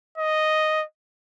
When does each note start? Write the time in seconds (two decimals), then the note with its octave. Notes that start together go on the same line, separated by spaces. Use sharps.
0.18 D#5